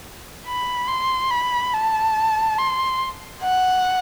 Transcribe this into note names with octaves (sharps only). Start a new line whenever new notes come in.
B5
C6
B5
A5
C6
F#5